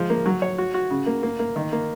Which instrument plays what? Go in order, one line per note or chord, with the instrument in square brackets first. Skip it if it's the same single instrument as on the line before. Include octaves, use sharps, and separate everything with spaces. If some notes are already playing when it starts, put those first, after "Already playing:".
Already playing: [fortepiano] F3 G#3
A#3
F#3
C#5
F#4
F#4
C#3
A#3
A#3
A#3
D#3
A#3